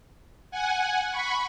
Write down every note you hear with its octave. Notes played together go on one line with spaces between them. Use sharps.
F#5 G#5
B5 C#6